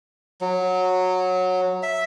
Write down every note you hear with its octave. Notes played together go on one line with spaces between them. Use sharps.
F#3
E5